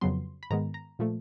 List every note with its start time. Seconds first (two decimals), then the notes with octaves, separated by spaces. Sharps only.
0.01 F2 C#3 F#3 B3 C6
0.43 B5
0.50 G#2 D#3 G#3 B3 A#5
0.74 A#5
0.99 A#2 F3 A3